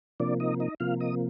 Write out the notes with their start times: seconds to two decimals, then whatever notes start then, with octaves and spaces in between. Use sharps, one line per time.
0.20 C3 F3 A#3 D4 D5
0.40 D#4 D#5
0.60 D#4 D#5
0.80 C3 F3 A#3 F4 F5
1.00 D#5 D#6